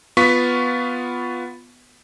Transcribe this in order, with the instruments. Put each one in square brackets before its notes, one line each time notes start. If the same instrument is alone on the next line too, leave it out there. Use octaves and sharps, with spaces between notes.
[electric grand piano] B3 F4 C#6 B6